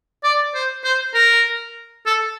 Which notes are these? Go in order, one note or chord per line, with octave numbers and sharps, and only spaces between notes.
D5
C5
C5
A#4
A4